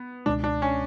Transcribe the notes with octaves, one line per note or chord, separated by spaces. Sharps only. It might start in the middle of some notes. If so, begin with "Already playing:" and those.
Already playing: B3
C#2 B2 G#3 D4
D4
C#4